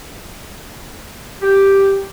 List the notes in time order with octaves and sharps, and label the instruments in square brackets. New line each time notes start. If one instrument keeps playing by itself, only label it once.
[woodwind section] G4